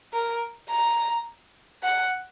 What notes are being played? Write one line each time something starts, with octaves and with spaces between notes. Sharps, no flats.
A#4
A#5
F#5